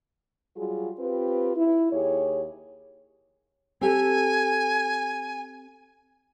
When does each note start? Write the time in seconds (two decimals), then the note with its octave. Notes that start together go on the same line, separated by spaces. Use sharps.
0.57 F#3 G3 F4 F#4 G#4
0.99 C4 F4 G4 B4
1.56 E4
1.93 D#2 G4 G#4 C#5
3.81 C4 G4 A4 G#5